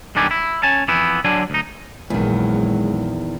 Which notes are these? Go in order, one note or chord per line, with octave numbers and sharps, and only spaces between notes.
B1 G2 D#3 D4 G4 G#5
E4
C#4 G#5 A5
F2 E3 B3 E4
D3 F#3 D4 G#5
D2 D#4
A#1 E2 D#3 F#3 G#3